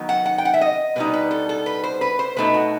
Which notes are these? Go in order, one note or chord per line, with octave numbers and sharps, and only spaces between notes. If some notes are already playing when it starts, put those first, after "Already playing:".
Already playing: D#3 F#3 B3 D#4
F#5
F#5
G5
F#5
E5
D#5
B2 G3 D#4 B4
B4
A4
A4
B4
C5
B4
C5
B2 A3 D#4 B4
F#4